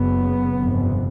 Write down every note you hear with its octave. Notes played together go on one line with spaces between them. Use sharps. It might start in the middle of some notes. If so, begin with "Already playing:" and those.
Already playing: F#1 F#2 C#3 B3
G1 F2 C3